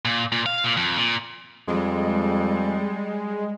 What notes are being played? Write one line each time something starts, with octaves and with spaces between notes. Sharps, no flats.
A#2
A#2
F5
A#2
F2
A#2
F2 G3 G#3